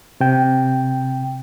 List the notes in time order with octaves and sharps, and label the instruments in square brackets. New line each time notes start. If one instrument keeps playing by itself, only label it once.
[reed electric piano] C3 G5